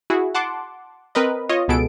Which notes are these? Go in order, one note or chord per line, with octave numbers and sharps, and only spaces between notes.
E4 F#4 G#4
F#5 A5 C6 D6
C4 A#4 B4 D#5
F4 C#5 D#5
C#2 B2 B3 G#4 A4 D7